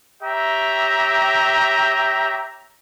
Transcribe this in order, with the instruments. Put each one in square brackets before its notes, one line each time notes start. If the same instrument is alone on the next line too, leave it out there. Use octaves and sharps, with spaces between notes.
[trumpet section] G4 C#5 E5 G5 A#5